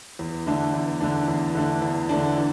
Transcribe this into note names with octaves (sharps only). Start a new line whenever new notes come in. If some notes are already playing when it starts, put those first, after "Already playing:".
E2
D3 A3 D4
E2
D3 A3 D4
E2
D3 A3 D4
E2
D3 A3 D4
E3